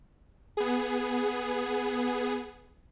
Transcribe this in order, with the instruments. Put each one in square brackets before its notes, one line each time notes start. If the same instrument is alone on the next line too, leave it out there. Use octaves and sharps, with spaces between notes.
[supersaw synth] B3 G#4